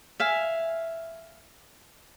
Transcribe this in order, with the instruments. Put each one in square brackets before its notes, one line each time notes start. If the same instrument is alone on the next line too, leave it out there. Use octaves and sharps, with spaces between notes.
[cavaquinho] E5 F5 G#5